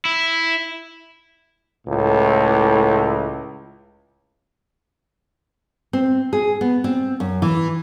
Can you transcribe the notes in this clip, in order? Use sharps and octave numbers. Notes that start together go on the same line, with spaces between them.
E4
C#2 A2
C4
G#4
B3
C4
F#2
E3